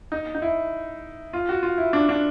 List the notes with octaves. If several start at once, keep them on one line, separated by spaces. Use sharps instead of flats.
D#4
D#4
E4
F4
F#4
F4
E4
D4
D4